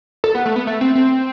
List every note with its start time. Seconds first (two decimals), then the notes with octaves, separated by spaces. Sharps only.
0.24 A4
0.35 B3
0.45 A3
0.56 B3
0.67 A3
0.81 C4
0.95 C4